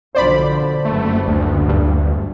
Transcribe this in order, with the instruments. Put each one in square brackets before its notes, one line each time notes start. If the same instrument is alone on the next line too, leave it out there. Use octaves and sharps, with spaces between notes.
[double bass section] B1 D3 F3 [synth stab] C5 D5 B5
[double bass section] F#1 G3 B3 [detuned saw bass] A3
[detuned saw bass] D2
[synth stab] G2